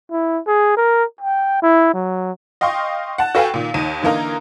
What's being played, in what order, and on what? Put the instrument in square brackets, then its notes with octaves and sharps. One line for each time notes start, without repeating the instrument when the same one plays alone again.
[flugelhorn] E4
G#4
A#4
G5
E4
F#3
[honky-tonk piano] D#5 F5 G5 C6 C#6
F#5 A5
F#4 A4 B4 F5 G5 G#5
A#2 D#3
D#2 D#4 D#7
D3 E3 A#3 D#4 A#4